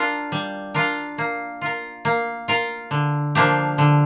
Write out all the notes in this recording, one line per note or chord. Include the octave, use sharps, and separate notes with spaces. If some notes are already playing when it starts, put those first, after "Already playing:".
Already playing: D4 F4 A#4
G3
D4 F4 A#4
A#3
F4 A#4
A#3
F4 A#4
D3
F3 A#3 D4 G4
D3